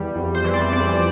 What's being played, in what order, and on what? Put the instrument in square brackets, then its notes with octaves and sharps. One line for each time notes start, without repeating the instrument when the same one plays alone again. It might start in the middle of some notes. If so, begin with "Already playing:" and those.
Already playing: [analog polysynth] E2 G3
F2
C5
E3
D5
F2 D5